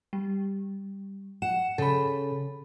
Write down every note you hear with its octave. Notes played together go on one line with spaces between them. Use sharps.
G3
F#5 E7
C#3 A4 B5